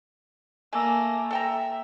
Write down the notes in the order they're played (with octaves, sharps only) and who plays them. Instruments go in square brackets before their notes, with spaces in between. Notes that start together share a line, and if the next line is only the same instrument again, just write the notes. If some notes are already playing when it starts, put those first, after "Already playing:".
[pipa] A3 [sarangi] A#3 [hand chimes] G#5 E6
[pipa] A4 G5 A#5 [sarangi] E5